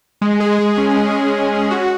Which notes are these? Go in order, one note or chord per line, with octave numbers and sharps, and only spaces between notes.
G#3
G#4
G#3
C#4
G#3
G#4
G#3
C#4
F#4